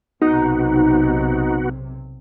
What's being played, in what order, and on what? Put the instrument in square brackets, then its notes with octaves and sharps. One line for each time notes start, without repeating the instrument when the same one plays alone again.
[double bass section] B1 C3 [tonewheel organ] B3 F#4 [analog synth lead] D#4